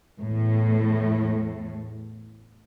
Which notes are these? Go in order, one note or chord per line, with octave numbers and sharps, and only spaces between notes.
E2 A2